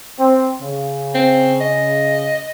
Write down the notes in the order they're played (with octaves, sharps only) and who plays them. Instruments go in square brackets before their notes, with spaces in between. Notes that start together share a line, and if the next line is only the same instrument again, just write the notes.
[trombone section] C4
C#3
[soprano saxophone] C4
D#5